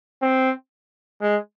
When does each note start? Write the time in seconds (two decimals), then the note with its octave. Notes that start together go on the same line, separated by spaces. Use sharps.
0.22 C4
1.22 G#3